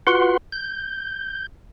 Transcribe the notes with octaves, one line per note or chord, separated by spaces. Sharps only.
F4 F#4 B4 F#5 C6
G6